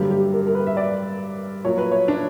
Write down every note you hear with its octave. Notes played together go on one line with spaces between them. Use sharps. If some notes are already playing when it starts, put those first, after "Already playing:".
Already playing: G2 D3 F#3 G4
G4
A#4
A#4
B4
E5
D5
A#2 F#3 C#5
B4
C#5
D4